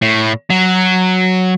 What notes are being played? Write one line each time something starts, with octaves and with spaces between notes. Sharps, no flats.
A2
F#3